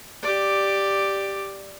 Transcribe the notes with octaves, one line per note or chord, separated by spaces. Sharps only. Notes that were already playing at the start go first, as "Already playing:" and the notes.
G4 D5